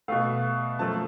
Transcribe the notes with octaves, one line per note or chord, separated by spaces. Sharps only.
B2 A3 F5
F#2 F3 A3 A5